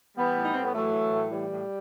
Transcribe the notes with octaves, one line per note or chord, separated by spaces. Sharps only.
E3 G3 B3
A2
D#4
A2 C4
B3
E3 F#3 A3
E3
A2
E3 G3
A2